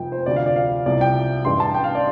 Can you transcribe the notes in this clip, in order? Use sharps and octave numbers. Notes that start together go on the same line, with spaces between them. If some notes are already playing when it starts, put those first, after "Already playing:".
Already playing: F1 F2 F3 G5
C5
D2 C3 F3 D5
F5
D5
F5
C2 C3 F3 D5
G5
A1 G2 G3 C6
A5
G5
F5
D5